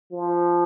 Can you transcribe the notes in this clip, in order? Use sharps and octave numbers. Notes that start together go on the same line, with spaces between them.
F3